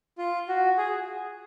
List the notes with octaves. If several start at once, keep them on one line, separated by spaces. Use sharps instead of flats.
F4
F#4
G#4